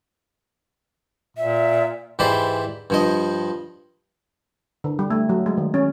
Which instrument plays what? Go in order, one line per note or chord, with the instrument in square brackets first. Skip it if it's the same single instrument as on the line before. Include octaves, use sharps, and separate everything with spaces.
[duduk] A#2 [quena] E5
[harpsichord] G#2 E3 G4 C5 D5 B5
G2 F3 D#5
[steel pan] D3
G3
A3
F#3
G#3
D#3
C#4